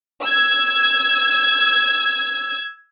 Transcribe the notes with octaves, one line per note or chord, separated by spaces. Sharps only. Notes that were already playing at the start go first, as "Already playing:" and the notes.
E6 G#6